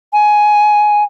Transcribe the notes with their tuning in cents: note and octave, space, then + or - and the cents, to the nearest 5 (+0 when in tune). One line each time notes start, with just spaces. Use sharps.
G#5 +10